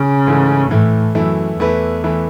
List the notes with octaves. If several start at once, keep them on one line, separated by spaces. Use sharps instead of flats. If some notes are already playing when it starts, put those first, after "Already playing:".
Already playing: C#3
G#2 E3 A3 E4
A2 E3 A3 E4
F#2 E3 A3 E4
E2 E3 A3 E4 B4
E3 A3 E4 B4